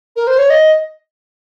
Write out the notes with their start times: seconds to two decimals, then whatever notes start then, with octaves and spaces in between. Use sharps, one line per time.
0.16 A#4
0.27 C5
0.38 C#5
0.50 D#5